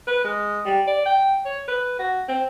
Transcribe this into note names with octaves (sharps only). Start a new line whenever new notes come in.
B4
G#3
G3
D5
G5
C#5
B4
F#4
C4